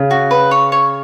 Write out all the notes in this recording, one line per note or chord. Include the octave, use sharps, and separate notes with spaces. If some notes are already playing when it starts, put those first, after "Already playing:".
Already playing: C#3
F#4
B4
C#5
C#5